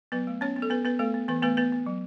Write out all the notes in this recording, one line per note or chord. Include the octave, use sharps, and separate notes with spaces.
F#3 B3 B4
A3
B3 C#4 C#5
B3
A4
B3 B4
B3 B4
A3 B3 A4
B3
E3 B3 B4
A3 B3 B4
B3 B4
B3
F#3